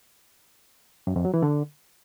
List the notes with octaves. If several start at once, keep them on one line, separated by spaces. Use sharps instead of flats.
F#2
F2
F#3
E3
D3